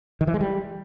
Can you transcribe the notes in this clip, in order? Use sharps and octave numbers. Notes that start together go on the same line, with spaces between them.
D#3
E3
G#3
G3